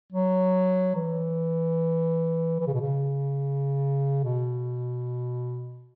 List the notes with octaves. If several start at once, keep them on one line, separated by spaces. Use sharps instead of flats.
F#3
E3
E3
C#3
B2
C#3
B2